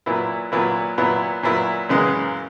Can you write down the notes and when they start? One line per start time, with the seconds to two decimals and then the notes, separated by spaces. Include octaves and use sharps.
0.06 A#2 F#3 B3 E4
0.52 A#2 F#3 B3 E4
0.98 A#2 F#3 B3 E4
1.43 A#2 F#3 B3 E4
1.89 F#2 C#3 E3 G#3 B3